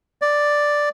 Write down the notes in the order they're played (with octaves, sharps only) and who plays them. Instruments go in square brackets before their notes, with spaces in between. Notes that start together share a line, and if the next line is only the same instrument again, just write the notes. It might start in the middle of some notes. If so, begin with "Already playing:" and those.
[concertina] D5